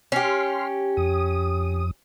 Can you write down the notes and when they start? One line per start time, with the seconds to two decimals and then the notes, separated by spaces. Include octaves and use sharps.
0.12 C#4 G4 C6 F6
0.97 F2 D#6